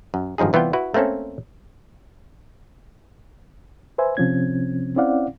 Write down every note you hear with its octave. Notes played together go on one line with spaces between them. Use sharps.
F#2
G#1 G2 F3 D#4 G#4
C2 E3 B3 F4 G5
E4 F#4 B4
A3 A#3 C4 C#4 A4
B4 C5 E5 G#5
C3 F3 C4 C#4 G#6
C4 C#4 E4 D5 F5 F#5